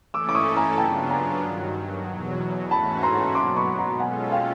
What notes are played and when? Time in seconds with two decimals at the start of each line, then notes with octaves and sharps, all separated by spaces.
0.14 E3 A3 C#4 E4 A4 D6 E6
0.29 D6
0.35 C#6 D#6
0.57 G#5 A#5
0.78 C#3 F#3 B3 D4 F4 G5 A5
1.10 G#5 A#5
1.42 G2 D#3 F#3
2.07 E2 B2 F#3
2.71 G#2 E3 A3 C#4 F#4 A5 B5
3.03 A#5 C6
3.35 B2 F#3 B3 C6 D6
3.57 B5 C#6
3.78 A#5 C6
3.99 B2 G#3 C#4 F4 A4 F#5 G#5
4.32 F5 G5